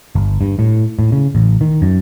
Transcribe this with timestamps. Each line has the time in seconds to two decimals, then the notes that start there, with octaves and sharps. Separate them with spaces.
0.15 G1
0.41 G2
0.59 A2
0.99 A2
1.12 C#3
1.35 A1
1.61 D#3
1.82 F#2